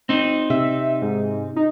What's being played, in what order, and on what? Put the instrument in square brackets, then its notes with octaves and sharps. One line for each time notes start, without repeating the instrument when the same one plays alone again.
[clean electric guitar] C4 D#4
[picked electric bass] C3 [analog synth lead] E5
[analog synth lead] G#2
D#4